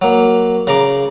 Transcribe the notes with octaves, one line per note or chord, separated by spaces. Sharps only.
F#3 A#3
C#3 A#5 D6